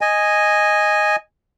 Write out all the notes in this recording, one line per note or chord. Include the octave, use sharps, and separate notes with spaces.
D#5 G#5